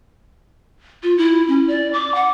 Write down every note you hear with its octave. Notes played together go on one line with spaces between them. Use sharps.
F4
E4
C#4
D5
D6
F#5